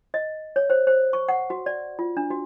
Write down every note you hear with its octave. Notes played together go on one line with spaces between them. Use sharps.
D#5
C#5
C5
C5
C#6
F#5
F#4
D5
F4
D4
F#4